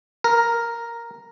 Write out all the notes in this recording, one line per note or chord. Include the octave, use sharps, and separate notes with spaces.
A#4